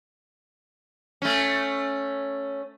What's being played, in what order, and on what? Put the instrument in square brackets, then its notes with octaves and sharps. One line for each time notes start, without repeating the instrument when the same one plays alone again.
[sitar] A3 C#4